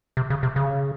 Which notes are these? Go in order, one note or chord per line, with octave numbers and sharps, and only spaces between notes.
C3
C#3
C3
C#3